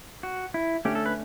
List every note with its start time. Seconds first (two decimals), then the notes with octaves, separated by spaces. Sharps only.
0.23 F#4
0.54 E4
0.85 D3 A3 C#4 G4
0.95 A4
1.06 B4